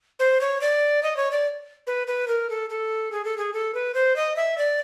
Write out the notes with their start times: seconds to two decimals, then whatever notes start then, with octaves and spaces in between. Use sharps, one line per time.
0.19 C5
0.41 C#5
0.61 D5
1.03 D#5
1.16 C#5
1.31 D5
1.87 B4
2.07 B4
2.28 A#4
2.50 A4
2.70 A4
3.12 G#4
3.24 A4
3.38 G#4
3.53 A4
3.74 B4
3.94 C5
4.16 D#5
4.36 E5
4.58 D5